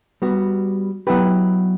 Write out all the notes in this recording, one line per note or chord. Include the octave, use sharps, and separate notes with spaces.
G3 B3 F#4
F#3 B3 E4 G4 B4